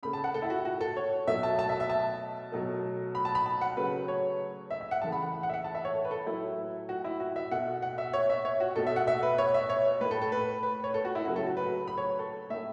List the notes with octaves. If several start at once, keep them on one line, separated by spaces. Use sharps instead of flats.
C#3 A3 B5
A5
F#5
A4
E4
F#4
F#4
A4
C#5
B2 F#3 A3 E5
A5
A5
E5
E5
A5
B2 F#3 A3
B5
A5
B5
A5
F#5
C#3 F#3 A3 B4
C#5
E5
E5
F#5
C#3 E3 A3 A5
B5
F#5
F#5
E5
F#5
A5
E5
C#5
A4
B4
A4
A2 F#3 A3 E4
F#4
E4
F#4
E5
B2 A3 F#5
F#5
E5
C#5
E5
C#5
F#4
B2 A3 A4
E5
F#5
E5
B4
C#5
E5
C#5
A2 A3 B4
A4
A4
B4
B4
C#5
A4
F#4
E4
C#3 F#3 A3 F#4
A4
F#4
B4
B5
C#5
A4
A2 A3 E5